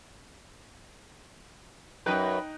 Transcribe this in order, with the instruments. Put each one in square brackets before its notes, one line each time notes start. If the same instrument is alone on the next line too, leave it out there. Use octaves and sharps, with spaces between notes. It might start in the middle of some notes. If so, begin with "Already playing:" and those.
[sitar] F#2 B4 [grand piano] D#4 G5 F#6